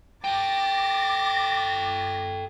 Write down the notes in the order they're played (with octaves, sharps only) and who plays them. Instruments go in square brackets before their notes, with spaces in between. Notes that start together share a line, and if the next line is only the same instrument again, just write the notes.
[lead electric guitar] A4 G5 [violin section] D6 A6 A#6